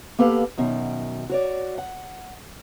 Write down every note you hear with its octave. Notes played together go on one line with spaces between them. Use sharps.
A#3 B3 G4 A4 B4 F5
F#2 B2 D#3
F#4 C#5 D5
F#5